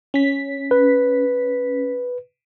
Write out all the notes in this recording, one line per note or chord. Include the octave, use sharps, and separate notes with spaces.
C#4 B6
B4